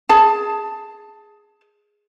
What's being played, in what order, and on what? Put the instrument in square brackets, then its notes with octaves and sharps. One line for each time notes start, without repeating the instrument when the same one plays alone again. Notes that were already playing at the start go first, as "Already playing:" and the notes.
[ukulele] G#4 A5